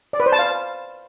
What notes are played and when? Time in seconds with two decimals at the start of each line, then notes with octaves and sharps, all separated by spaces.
0.13 D5
0.20 B4
0.26 C5
0.32 A5
0.39 F5